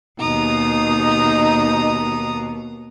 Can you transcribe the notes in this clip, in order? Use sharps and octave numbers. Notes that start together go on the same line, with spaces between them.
D#2 B2 D#4 A#5 D#6